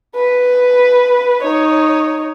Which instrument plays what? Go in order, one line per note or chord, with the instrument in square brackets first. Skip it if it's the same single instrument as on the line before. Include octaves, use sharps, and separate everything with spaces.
[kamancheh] B4
D#4 C#5